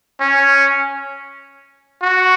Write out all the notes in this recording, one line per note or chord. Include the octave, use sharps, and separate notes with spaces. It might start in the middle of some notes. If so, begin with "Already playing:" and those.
C#4
F#4